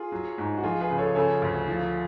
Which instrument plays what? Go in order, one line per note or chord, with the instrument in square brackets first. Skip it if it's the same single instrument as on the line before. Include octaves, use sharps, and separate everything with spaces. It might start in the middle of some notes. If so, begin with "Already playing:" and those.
Already playing: [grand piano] F4 G#4
[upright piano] F#3
G#2
[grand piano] F#4
[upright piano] F3 [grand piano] F4 G#4
[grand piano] G#4 B4
[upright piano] C#3
[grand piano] A4 C#5
[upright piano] C#3 [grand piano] A4 C#5
[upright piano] D2
F3